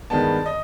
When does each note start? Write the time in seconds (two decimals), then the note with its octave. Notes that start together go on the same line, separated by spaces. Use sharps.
0.10 G2 D#3 G#3 B3 A5
0.46 D#5